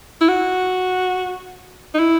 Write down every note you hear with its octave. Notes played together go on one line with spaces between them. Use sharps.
E4
F#4
D#4
E4